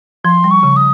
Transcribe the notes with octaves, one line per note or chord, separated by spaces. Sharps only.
F3 C6
G3
C#6
C#3
D#6